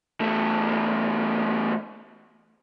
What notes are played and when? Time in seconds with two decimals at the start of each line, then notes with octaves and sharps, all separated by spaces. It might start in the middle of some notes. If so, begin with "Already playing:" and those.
0.21 E2 A3